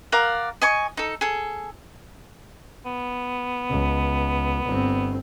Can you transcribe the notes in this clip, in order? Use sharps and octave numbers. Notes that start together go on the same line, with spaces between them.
A#4 D5 F5 F#5
D#5 G#5 C#6
D#4 A4
G#4 A4
B3
C#2
G1 C4